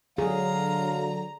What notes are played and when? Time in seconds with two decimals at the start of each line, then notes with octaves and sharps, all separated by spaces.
0.18 D3 F#3 G#4 F5 A#5